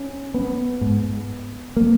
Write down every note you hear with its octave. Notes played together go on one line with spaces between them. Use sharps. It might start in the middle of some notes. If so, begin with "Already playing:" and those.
Already playing: C#4
B3
G#2
A#3